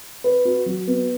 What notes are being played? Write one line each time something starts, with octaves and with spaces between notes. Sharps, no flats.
B4
F#4
F#3
B3